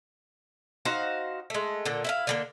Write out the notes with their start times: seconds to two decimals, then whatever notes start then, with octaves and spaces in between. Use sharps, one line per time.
0.85 D#4 F#4 C5 F5
1.50 G#3 A3
1.85 A#2 D3
2.04 E4 E5 F5
2.27 D3 G3 A#3